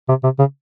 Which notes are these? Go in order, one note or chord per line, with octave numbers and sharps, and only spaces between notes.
C3
C3
C#3